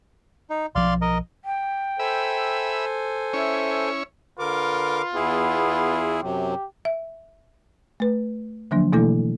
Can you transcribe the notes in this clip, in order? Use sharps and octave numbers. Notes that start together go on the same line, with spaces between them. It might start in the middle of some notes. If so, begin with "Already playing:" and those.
D#4
B1 F3 D5 F5 C6
A#4 D#5
G5
A4 C5 E5 G#5 B5
C#4 E4 C#5 E5
D3 F4 A#4 B4 D6
E2 B3 E4 G#4
F#2 C3 F#3 G4
E5
A3 B4
D3 F3 F#3 A#3 D4
B2 E3 A3 A#3 E4 A4